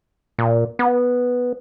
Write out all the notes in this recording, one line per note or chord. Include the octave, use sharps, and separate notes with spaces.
A#2
B3